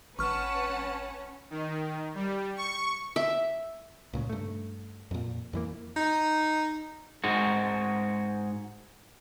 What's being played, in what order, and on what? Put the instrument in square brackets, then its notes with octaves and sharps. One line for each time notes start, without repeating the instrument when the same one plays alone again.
[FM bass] G#1 [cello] C#4 [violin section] B4 F#5 A5 [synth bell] C#6 F6
[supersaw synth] D#3
G3
C#6
[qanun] E5
[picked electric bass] C#2 A#2 C#3
G2 A3
F2 A#2
F2 E3 A#3
[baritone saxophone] D#4
[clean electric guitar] G#2 G#3 F#4